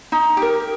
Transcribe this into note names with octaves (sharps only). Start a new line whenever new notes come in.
D#4
G4 A#4